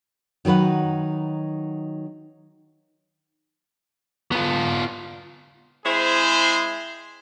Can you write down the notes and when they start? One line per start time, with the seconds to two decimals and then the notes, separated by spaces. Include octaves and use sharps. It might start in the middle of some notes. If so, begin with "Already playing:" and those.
0.45 D#3 F#3 D#4 B4 F#5
4.32 B3 F4
5.84 G#3 C4 E4 G#4 C5